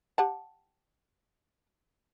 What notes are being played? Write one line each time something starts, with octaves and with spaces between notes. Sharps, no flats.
G4 F#5 A5